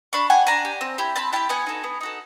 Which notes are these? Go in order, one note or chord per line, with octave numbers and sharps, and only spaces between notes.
D4 B5 C#6
G4 F#5 G#5
D4 G#5 A#5
G4
C4
E4 G4
C4 A5 B5
E4 G4 G5 A5
B3 F#5 G#5
D#4 F#4 A4
B3
D#4 F#4 A4